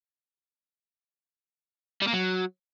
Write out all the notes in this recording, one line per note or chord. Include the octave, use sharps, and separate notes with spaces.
G3
A#3
F#3